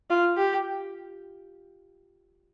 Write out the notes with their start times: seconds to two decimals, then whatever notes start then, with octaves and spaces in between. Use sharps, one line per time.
0.10 F4
0.37 G4